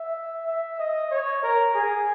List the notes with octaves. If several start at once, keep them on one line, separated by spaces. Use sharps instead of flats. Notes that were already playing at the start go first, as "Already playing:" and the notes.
Already playing: E5
E5
D#5
C#5
A#4
G#4